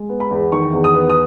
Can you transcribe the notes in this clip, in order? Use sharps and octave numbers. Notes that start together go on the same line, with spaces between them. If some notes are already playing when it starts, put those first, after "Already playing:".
Already playing: G#3
B3
B5
E2
D#3 C#6
E2
D#6
B3
D#6